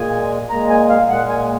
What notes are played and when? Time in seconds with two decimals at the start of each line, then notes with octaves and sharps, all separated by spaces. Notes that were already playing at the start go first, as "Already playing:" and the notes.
Already playing: A#2 G#3 G#5
0.50 A#2 G#3 A#5
0.70 G#5
0.89 F5
1.09 A#2 G#3 F#5
1.29 G#5